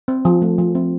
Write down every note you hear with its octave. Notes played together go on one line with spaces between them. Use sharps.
C4
F3
A3
F3
C4